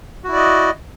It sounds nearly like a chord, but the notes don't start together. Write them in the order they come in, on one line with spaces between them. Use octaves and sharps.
F#4 E4 D5 D#5